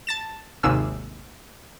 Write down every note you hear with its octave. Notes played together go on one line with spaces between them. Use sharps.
A5 A6 E7
G#1 D#2 C3 G#3 E6